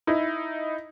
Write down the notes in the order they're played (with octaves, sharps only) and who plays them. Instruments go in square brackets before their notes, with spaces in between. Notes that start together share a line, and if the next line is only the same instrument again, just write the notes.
[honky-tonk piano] D#4 E4